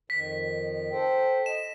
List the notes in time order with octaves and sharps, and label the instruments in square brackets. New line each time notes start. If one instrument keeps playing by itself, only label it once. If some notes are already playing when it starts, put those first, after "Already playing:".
[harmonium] F2 D#3 [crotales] B6
[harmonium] A4 C5 G5
[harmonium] D#5 [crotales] E7